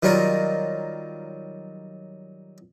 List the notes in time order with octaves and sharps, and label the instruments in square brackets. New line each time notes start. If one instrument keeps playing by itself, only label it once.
[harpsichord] D#3 F#3 G3 D#4 F4 A#4